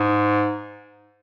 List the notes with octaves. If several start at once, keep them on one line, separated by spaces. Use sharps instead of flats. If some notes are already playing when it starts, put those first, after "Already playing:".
Already playing: G#2